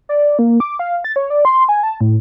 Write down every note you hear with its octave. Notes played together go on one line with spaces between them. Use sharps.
D5
A#3
D6
F5
A6
C#5
D5
C6
G#5
A5
A2